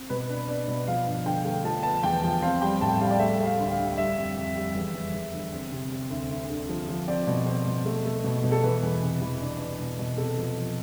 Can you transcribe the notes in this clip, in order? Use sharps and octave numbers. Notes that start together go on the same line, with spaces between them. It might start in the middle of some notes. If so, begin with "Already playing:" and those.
Already playing: C4
B2 B4
D4
D4 D5
B2
F3 F5
G2
D3 G5
A3
F3 A5
B3 A5
E2 G5
F3
C4 F5
G3 G5
A2 A5
G3 F5
D5
A3 E5
A3
F5
D2
F5
D3
G3 E5
F2
F2
G3
E2
E2
E2
D3
C4
C3
C4
D2
D2
D3
F3
F3
C4 D5
B2
C4
B2
A3
A3
B2
B2
A4
E3 B4
E2
C3
E3
D4
D4
B2
B2
C3 A4
F3
F3